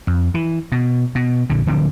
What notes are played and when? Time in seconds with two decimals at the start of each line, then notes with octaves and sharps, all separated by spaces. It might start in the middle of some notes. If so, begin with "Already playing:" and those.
0.07 F2
0.34 E3
0.72 B2
1.15 B2
1.50 A#1 D3
1.66 D1 D3 F3 C4